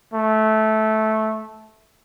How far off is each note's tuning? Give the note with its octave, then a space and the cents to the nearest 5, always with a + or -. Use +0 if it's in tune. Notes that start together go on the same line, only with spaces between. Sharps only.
A3 -15